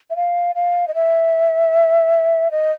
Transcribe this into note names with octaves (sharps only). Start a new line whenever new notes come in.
E5
F5
F5
D#5
E5
D#5